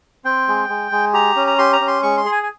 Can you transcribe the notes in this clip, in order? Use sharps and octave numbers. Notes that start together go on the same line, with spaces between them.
C4 G5
G#3
G#3
G#3
G4 A#5
C#4
A#5
G4 C6
A#5
C#4
C6
G#3 C#6
C6
G#4
G#5
G#5